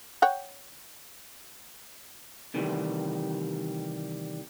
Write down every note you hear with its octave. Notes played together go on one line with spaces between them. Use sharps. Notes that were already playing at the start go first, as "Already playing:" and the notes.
C#5 F#5 G5
C3 D#3 E3 G3 A3